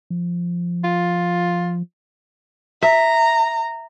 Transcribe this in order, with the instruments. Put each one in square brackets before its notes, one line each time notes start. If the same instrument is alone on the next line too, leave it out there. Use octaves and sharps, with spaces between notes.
[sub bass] F3
[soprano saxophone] F4
[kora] E5 [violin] A#5